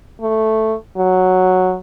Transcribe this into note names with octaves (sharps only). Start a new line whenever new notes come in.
A3
F#3